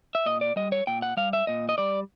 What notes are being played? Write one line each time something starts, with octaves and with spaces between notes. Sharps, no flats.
E5
A#2 D#5
D5
G3 D#5
C#5
A#2 G5
F#5
G3 F5
E5
A#2 D#5
D#5
G3 D5